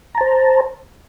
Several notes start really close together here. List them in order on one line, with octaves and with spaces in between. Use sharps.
A#5 A5 C5